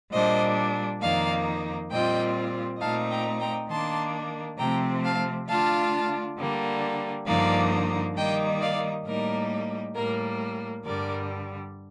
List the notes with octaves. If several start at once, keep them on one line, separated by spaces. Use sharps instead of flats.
A#2 G3 D4 C5 D#5
F2 D#3 A#3 D#4 D5 F5
A#2 G3 C4 F4 D#5 G5
A#2 A3 C4 D#4 F5 A5
G5 A#5
G5 A#5
D#3 A#3 D4 A5 C6
C3 F3 A3 C4 G5 A#5
F5 A5
D3 A3 D4 F4 F5 A5
D3 G3 A#3
G2 D3 F3 A#3 D#4 D5 F5
D#3 G3 A#3 D#4 D#5 G5
D5 F5
A2 G3 A#3 D#4 A#4
A2 G3 A#3 A#4
G2 D3 G3 A#4 D5